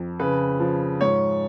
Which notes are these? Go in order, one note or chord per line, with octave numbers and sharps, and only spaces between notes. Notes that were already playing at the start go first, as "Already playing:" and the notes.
Already playing: F2
C#3 B4
F3
G#2 C#5